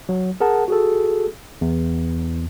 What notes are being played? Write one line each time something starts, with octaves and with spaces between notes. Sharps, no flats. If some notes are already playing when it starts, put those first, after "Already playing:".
F#3
G#4 A#4 F#5 A5
F#4 G#4 A4
E2